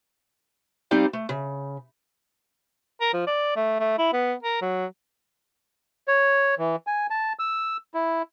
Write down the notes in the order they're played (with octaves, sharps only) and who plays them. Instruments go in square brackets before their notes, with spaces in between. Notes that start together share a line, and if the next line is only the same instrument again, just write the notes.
[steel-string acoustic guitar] G3 C4 D#4 G4 D5 F5
A3
C#3
[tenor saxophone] A#4
F3
D5
A3
A3
E4
B3
A#4
F#3
[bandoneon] C#5
E3
G#5
A5
E6
E4